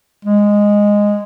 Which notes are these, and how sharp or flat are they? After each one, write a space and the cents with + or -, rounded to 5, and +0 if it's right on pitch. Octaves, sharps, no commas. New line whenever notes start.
G#3 -10